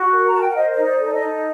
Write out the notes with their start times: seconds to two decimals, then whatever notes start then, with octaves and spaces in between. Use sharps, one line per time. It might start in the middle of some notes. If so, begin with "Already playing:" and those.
Already playing: F#4
0.11 A#4
0.26 A#5
0.32 A#4 A5
0.40 G5
0.48 F#5
0.55 C5 D#5
0.74 D#4 D#5
0.83 D5
0.99 A4
1.06 D5
1.13 D#5
1.20 D#4